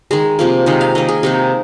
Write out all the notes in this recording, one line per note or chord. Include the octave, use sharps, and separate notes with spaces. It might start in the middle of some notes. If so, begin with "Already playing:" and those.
D#3 G#3 G#4
C3 F3 A#3
C3 D#3 G#3 D#4
F5
D#3 A#3 D#5
G#4
C3 D#3 G#3 D#4